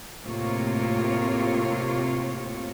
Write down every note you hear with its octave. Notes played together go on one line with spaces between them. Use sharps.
A2 C3 A#3 F4 C#5